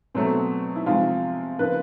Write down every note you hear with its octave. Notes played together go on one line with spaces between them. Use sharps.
B2 F#3 A3 C4
E4
C3 F3 G#3 F4
C#3 F3 A#3 B4